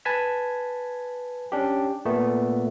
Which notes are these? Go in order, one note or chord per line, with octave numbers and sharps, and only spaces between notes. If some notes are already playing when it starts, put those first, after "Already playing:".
B4 G#5 A5 G#6 B6
C#4 D4 G4
A#2 A3 B3